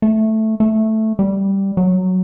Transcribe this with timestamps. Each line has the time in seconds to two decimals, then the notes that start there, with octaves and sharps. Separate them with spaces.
0.02 A3
0.60 A3
1.19 G3
1.77 F#3